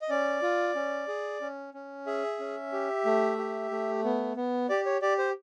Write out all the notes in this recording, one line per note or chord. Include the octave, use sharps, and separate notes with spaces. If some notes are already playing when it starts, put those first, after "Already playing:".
D#5
C#4 D5
F4
C#4
G#4
C#4
C#4
G#4 E5
C#4
G4
A3
G4
A3
B3
B3
G4 D5
C#5
G4 D5
C5